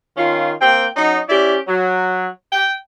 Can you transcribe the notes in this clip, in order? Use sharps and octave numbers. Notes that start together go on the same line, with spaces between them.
D#3 C#4 F4
A#3 C4 G5
F#3 C#4 D#4
C#4 E4 G4 D5
F#3
G5